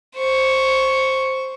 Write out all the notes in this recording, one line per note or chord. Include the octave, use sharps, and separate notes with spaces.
C5 C#6